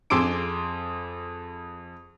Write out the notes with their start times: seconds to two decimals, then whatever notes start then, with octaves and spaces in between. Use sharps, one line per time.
0.10 F2 G#4 C6 D6 E6 D7